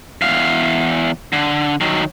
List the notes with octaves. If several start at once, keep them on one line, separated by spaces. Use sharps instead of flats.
E2 F5
D3
D#3 F#3